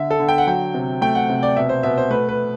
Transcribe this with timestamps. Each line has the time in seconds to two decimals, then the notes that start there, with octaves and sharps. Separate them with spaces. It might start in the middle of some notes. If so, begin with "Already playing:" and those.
Already playing: D3 E5
0.11 A4
0.19 D3
0.28 G5
0.38 F#5
0.47 F#3 G5
0.74 C3
1.01 A3 G5
1.15 F#5
1.29 C3
1.43 D5
1.57 B2 E5
1.69 C5
1.83 B2 E5
1.98 C5
2.10 A3 B4
2.29 B4